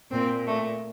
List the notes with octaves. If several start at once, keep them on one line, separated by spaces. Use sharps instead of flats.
A#2 C4
A3